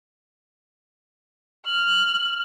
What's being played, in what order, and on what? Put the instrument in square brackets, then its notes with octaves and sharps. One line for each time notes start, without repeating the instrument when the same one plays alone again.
[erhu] F6 [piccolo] F#7